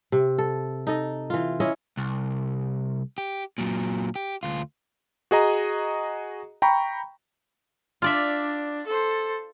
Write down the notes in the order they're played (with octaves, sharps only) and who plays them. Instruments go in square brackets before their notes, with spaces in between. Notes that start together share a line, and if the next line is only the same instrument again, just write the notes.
[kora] C3
A4
D#4 A4 D#5
E3 F4
C#4 E4 C#5 D#5
[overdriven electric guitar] C2
G4
A#2 F#3
G4
D2 F4
[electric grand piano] F#4 G#4 D#5 A#5
G5 A#5 B5 C#6
[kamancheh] D4 [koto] F4 D5 E5
[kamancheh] A4 C5